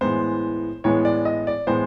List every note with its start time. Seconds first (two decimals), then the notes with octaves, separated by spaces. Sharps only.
0.01 A2 E3 G#3 B3 C5
0.84 A2 E3 G#3 B3 C#5
1.05 D5
1.25 D#5
1.47 D5
1.67 A2 E3 G#3 B3 C5